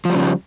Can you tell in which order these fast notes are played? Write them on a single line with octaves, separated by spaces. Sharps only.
F3 G3 C#3